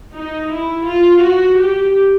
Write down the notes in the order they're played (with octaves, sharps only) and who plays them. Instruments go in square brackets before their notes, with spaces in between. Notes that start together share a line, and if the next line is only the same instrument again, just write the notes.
[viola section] D#4
E4
F4
F#4
G4